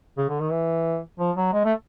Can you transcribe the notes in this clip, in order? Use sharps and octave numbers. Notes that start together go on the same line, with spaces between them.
C#3
D3
D#3
E3
F3
F#3
G#3
A3